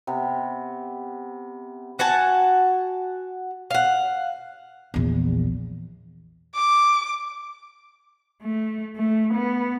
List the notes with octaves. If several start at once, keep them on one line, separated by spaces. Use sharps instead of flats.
C3 B3
F#4 F#5 G#5 A5
F5 F#5
A#1 E2
D6
A3
A3
B3